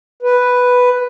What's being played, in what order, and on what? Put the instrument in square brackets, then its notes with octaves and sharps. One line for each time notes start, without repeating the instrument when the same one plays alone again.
[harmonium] B4